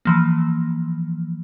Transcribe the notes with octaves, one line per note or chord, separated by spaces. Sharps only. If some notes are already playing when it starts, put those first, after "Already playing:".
E3 F3 A#3